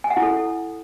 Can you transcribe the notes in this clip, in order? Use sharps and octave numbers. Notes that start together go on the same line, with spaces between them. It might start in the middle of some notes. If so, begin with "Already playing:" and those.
G#5
F#5
E4
A4